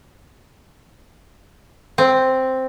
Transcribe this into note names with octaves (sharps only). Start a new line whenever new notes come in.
C4